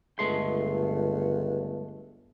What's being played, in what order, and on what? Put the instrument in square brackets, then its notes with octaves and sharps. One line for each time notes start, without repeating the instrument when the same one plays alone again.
[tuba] G1 [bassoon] C#2 [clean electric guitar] G#3 A3 C6